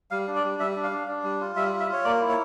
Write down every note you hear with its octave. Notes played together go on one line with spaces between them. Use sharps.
G3 F5
D4
D5
G3
G3 E5
D4
F5
D4
D4
G3
F4
G3 E5
F4
E5
F4 C#5
A#3 D5
E4
C#5